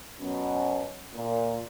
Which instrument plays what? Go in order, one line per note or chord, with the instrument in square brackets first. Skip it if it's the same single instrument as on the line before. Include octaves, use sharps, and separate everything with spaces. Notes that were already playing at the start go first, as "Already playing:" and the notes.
[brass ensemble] F#2 B2 C#4
A#2